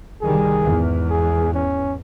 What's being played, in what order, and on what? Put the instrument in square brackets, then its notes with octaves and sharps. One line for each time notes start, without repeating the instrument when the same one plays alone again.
[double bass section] C2 D#3 G3 [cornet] G#4
[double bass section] E2 G#2
[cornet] G#4
C#4